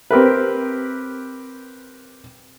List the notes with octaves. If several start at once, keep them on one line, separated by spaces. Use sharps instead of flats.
C4 G4 A#4 B4